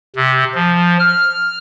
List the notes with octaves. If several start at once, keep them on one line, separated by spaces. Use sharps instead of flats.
C3
F3
F6